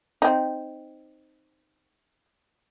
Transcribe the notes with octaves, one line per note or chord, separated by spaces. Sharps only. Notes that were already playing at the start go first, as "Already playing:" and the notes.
C4 D#4